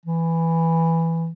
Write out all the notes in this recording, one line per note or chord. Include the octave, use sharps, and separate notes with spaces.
E3